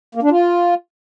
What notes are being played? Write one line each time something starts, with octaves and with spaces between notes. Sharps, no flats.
A#3
D4
F4